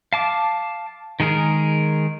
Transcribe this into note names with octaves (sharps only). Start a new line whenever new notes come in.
F5 A5 D6
D#3 G#3 G#4 A#4